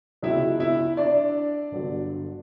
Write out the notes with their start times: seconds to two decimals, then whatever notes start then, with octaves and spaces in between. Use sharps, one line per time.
0.23 C#2 B2 F#3 E4 E5
0.60 E4 E5
0.97 D4 D5
1.71 G1 G2 D3 F#3